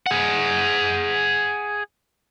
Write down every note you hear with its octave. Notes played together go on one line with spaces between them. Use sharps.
G#4 F#5